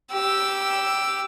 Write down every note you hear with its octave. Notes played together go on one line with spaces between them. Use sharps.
G4 E6